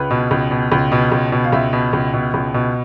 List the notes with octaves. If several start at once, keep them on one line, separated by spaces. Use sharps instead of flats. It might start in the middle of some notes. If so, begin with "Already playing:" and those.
Already playing: C#2 B4
B2
C#2
B2
C#2
B2
C#2
B2
F5
C#2 E5
B2
C#2
B2
C#2
B2